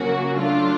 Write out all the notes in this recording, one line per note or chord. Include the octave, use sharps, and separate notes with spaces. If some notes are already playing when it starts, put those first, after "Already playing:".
Already playing: C#3 F#3 A#3 C#4 F#4
F#3 A3 D4 F4